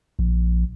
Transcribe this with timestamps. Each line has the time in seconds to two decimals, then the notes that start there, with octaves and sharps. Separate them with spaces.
0.19 A#1